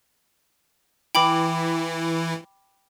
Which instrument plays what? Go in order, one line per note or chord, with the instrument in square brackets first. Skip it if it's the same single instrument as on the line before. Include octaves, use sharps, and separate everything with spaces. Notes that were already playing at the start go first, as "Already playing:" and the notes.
[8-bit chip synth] E3 E4 [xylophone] G5 B5 D6